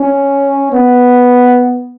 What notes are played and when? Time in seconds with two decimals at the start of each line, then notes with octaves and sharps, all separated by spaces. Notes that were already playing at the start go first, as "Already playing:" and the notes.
Already playing: C#4
0.72 B3